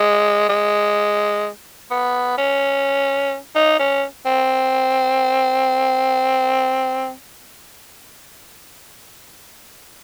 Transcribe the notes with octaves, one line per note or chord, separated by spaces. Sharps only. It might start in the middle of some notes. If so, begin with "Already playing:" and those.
Already playing: G#3
G#3
B3
C#4
D#4
C#4
C4